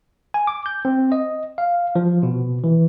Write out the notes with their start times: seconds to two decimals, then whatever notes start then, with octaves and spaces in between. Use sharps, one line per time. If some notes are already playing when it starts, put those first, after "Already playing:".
0.34 G#5
0.47 D6
0.66 G6
0.85 C4
1.12 D#5
1.58 F5
1.95 F3
2.23 B2
2.64 E3